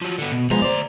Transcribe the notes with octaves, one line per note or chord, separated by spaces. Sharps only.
F3 F#3
D3 B3
B2
D2 F3 G#3 B3 A#5
C5 D5